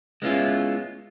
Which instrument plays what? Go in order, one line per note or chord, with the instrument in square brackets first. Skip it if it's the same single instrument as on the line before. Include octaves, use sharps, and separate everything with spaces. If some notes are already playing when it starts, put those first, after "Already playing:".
[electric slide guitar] G#3 B3 C#4 E4 F4